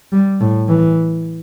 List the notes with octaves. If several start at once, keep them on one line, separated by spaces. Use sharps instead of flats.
G3
A2
E3